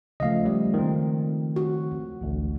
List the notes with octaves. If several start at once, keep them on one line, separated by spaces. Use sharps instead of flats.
C#3 F3 A3 D#5 F5
G3
D#3 G#3 C4
F#4
A1 D2